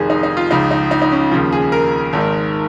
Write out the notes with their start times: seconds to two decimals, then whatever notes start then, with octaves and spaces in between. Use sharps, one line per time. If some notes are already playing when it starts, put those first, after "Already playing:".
Already playing: F1 F2 D#3 G#4
0.10 D#4
0.23 D#4
0.37 F4
0.50 C#2 C#3 F3 D#4
0.71 D#4
0.91 D#4
1.02 D#4
1.12 C#4
1.31 D#2 C#3 F3
1.52 G#4
1.72 A#4
2.13 G#1 G#2 D#3